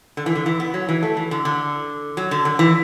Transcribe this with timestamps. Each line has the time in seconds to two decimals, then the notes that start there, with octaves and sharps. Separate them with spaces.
0.17 D3
0.26 E3
0.35 D3
0.46 E3
0.60 B3
0.74 F#3
0.89 E3
1.03 A3
1.17 E3
1.31 D3
1.45 D3
2.17 F#3
2.31 D3
2.45 D3
2.59 E3